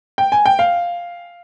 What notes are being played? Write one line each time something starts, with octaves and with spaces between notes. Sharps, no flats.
G5
G#5
G5
F5